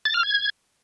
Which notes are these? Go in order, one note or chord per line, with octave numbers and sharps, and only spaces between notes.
A6
F6
G#6